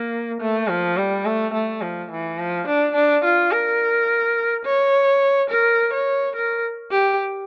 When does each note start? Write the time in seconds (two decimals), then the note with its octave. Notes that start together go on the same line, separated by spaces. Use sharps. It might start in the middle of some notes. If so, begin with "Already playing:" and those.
Already playing: A#3
0.41 A3
0.69 F3
0.97 G3
1.26 A3
1.54 A3
1.82 F3
2.11 E3
2.39 F3
2.67 D4
2.95 D4
3.24 F4
3.52 A#4
4.65 C#5
5.50 A#4
5.93 C#5
6.36 A#4
6.92 G4